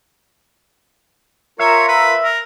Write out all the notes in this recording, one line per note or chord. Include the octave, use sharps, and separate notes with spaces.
F4 A#4 C#5 E5
B4
A#4